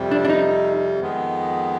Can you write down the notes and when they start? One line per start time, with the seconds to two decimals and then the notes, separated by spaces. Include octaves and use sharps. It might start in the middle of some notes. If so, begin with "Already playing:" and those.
Already playing: F2 C3 G3
0.11 D4
0.25 D4
0.30 D#4
0.99 F2 D#3 G#3 B3